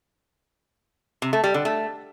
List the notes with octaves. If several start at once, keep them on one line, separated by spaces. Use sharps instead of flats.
C3
A3
G3
D3
A3